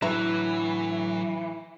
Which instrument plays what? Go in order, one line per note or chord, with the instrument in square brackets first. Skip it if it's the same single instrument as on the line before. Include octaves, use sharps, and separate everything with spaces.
[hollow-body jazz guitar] A2 D3 A#5 [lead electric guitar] E3 [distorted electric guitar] F#3 [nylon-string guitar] B4 E5